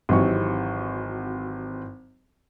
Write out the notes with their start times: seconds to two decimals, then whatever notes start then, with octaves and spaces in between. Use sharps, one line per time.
0.09 G#1 E3 F#3 C4 G4 C#6